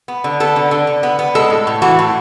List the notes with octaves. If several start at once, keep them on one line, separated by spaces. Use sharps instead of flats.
B3
D3
B3 A4
D3
D3
D3
B3
B3
G#3 A4
A2
A2
E3 F#4
A2